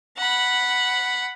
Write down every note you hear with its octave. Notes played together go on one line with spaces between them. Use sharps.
F#5 B5